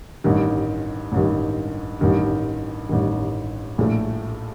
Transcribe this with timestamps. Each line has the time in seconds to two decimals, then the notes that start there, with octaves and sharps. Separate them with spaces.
0.24 A1 G2 D#3
1.12 A1 G2 D#3
2.01 A1 G2 D#3
2.89 A1 G2 D#3
3.78 A#1 A2 A3